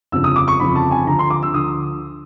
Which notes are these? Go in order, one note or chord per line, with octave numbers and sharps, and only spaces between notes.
G1 F2 C#3 F3 E6
D#6
D6
C#6
G1 F2 C#3 F3 B5
A5
G#5
D2 D3 F3 A#5
C6
D6
E6
D2 D3 F3 D#6